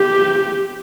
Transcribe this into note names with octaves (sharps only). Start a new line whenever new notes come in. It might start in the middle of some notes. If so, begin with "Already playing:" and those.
Already playing: G4